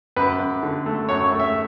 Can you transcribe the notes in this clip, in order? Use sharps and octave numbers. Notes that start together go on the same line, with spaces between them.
F#2 B4
F#2
D3
A3
F#2 C#5
C#5
A3
E5